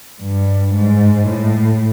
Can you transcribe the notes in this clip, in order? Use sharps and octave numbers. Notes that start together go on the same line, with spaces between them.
G2
G#2
A2